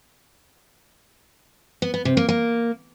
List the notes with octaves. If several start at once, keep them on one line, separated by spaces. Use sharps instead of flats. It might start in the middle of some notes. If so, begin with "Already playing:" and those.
B3
B3
C3
A#3
A#3